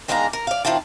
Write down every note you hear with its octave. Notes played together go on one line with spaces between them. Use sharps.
E2 D#3 G#3 D4 F5 A#5
A#4
D5 F5
D#3 C4 E4 F4 A5